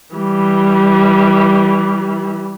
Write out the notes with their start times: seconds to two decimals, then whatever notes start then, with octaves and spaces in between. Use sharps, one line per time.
0.15 E3 G3